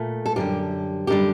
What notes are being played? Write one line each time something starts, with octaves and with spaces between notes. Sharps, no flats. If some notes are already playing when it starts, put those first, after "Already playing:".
Already playing: A#2 A3
A4
F#2 D3 G3 G4
F#2 D3 G3 G4